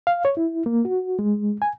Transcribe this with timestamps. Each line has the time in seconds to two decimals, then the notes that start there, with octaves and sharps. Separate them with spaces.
0.07 F5
0.25 C#5
0.37 E4
0.66 A#3
0.85 F#4
1.19 G#3
1.62 G#5